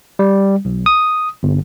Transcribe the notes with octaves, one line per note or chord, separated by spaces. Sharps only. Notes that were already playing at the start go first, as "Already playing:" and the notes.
G3
B1
D#6
G1